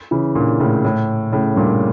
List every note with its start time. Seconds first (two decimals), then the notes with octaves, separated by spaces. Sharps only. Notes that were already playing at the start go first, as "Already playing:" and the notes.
0.11 C#3 E3
0.35 A#2 D3
0.60 A2 C#3
0.85 A2
1.32 A2 C#3
1.56 G2 A#2